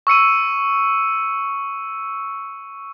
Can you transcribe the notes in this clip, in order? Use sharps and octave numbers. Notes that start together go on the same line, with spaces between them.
C#6 E6 C#7 D#7